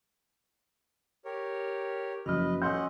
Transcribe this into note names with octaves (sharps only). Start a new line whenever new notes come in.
G4 A#4 C#5
F#1 F3 F#4 B4 D#5
C#4 D#5 F#5 C6 E6 G6